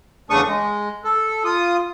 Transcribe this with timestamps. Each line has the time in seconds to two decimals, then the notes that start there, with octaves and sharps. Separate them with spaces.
0.30 E2 C#3 A3 D4 C#6 D#6
0.47 G#3
1.04 A4
1.44 F4 D#6